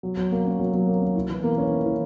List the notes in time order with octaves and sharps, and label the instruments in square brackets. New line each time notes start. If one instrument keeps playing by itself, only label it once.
[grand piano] F#3
F#3
A#3
C#4
F#3
F#3
A#3
C#4
E4
E3
A#3
C#4
E4
E3